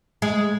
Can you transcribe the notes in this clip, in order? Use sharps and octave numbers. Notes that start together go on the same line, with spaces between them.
G#3